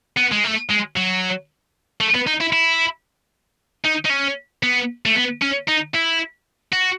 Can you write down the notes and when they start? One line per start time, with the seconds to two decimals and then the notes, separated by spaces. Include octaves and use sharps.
0.17 B3
0.31 G#3
0.44 A3
0.69 G#3
0.96 F#3
2.01 A3
2.15 B3
2.27 D#4
2.41 E4
2.53 E4
3.85 D#4
4.05 D#4
4.10 C#4
4.63 B3
5.06 A3
5.15 B3
5.42 C#4
5.68 D#4
5.95 E4
6.73 F#4